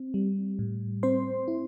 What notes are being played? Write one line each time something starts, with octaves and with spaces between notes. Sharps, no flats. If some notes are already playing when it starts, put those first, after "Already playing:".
Already playing: C4
G3
A2
C4 C5 C6
E4